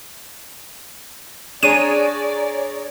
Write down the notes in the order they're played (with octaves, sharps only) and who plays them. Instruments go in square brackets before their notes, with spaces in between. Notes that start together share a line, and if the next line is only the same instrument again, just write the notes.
[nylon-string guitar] D4 [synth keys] G#4 C#5 A#5 [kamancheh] D5 [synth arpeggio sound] D#7